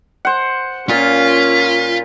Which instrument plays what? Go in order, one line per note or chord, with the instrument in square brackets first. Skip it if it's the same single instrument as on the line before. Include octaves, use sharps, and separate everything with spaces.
[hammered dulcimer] C5 F#5
[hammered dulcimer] A#2 [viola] C#4 [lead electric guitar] F4 [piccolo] B6